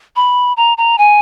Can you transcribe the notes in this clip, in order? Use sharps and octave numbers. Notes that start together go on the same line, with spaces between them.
B5
A#5
A#5
G#5